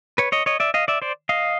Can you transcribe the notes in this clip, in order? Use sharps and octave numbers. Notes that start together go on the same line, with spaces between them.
B4 C#5
C#5 D#5
C#5 D#5
D5 E5
D#5 F5
D5 E5
C5 D5
D#5 F5